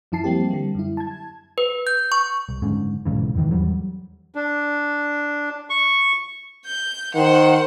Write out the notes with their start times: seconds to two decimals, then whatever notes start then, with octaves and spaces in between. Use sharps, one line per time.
0.12 F#2 F3 E4 A5 C7
0.24 G3 A#3 C4 G4
0.51 D3 G3
0.75 F#2 E4
0.97 A5 G#6
1.58 B4
1.87 G6
2.12 C#6
2.49 C2
2.62 F#1 G#2 D3 C#4
3.06 B1 G#2 C#3 E3
3.35 F2 G#2 D#3 E3
3.51 E2 F#3 G3
4.35 D4
5.70 C#6
6.65 G6
7.15 D#3 C5 F#5